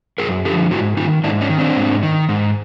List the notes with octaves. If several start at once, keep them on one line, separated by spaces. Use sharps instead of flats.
F#2 G#4 A#4
D3 F3 G4 A4
G#2 E4 F#4
D#3 D#4 F4
G#2 D4 E4
C#4 D#4
D#3
C4 D4
G#2
D#3
G#2